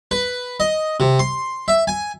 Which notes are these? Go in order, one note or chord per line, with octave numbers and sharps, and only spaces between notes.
B4
D#5
C3
C6
E5
G#5